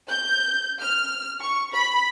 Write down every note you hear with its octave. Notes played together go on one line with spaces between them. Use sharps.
G6
F6
C#6
B5